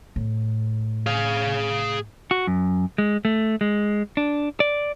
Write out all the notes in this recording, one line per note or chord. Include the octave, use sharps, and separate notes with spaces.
A2
G#4 F5
F#4
F#2
G#3
A3
G#3
D4
D5